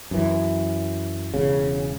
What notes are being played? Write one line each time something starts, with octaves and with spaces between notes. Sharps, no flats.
F#2 E3
E1 C#3